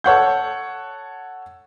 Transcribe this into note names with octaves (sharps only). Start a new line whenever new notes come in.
A4 C#5 F#5 G6